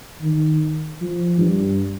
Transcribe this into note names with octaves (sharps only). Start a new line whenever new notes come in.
D#3
F3
G2